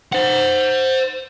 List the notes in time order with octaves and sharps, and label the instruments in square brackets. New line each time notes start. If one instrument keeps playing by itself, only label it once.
[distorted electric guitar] C5 F#5